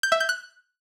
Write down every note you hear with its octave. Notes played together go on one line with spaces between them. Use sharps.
G6
E5
G6
F#6